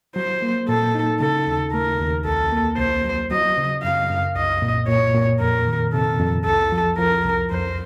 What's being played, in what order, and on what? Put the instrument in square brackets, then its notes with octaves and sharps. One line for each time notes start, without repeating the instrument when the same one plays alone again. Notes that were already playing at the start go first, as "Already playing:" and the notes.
[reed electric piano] F#3 [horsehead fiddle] C5
[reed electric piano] A#3
[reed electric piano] A#2 [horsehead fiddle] A4
[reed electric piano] D#4
[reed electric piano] C#3 [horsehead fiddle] A4
[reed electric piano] D#2
[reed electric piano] A3 [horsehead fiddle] A#4
[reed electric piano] D#2
[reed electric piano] C2 [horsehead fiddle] A4
[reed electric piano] A#3
[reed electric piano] C2 [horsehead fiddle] C5
[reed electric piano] F#3
[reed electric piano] F#3 [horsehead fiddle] D#5
[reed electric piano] C#3
[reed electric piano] F#2 [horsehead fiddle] F5
[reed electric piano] F#2
[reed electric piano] C2 [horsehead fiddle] D#5
[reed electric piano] A#2
[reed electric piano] A#2 [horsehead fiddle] C#5
[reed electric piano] A#2
[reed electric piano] F2 [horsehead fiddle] A#4
[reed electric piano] D#3
[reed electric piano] C3 [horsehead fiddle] A4
[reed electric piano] F2
[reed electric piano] C2 [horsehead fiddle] A4
[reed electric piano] F3
[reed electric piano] F3 [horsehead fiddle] A#4
[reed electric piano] C2
[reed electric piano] F2 [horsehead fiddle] C5